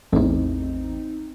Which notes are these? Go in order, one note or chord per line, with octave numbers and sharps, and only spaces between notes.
A1 E2 C4 D#4